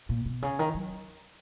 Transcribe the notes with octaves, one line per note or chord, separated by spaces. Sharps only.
A#2
B2
C#3
D#3
F#3